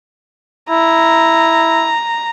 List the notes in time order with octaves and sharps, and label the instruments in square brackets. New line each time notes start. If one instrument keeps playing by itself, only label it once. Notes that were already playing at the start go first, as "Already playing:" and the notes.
[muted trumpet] E4 [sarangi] A#5